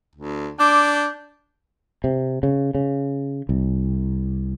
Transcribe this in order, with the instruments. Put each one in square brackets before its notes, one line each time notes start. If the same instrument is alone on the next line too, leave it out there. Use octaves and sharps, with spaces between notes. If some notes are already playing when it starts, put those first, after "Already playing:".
[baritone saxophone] D2
[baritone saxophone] D4 [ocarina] D6 [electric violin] G6
[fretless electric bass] C3
C#3
C#3
C2